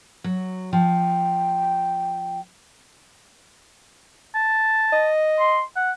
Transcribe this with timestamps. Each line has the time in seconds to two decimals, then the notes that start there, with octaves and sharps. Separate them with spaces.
0.24 F#3
0.73 F3 G5
4.35 A5
4.93 D#5
5.40 C6
5.76 F#5